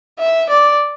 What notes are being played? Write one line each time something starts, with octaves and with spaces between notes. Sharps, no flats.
E5
D5